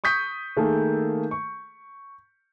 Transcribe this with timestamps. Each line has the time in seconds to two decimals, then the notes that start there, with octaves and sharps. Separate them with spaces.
0.04 C#6 D#6 G6 B6
0.57 D#3 A3 A#3 G#4 A4
1.31 C#6